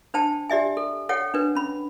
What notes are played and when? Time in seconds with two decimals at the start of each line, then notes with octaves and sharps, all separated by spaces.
0.14 D4 C5 G5 A5
0.50 G4 D5 E5 G#5
0.77 A4
1.09 A4 C#5 F#5 G5
1.34 D4 B4
1.55 C#4 B5